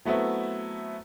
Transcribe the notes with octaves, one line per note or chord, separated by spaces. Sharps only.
F#3 A3 B3 C4 E4